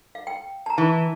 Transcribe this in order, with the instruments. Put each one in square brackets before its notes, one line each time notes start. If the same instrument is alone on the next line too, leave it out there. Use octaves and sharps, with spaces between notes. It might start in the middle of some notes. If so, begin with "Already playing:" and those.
[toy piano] F5
G5
A5 A#5
[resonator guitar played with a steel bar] E3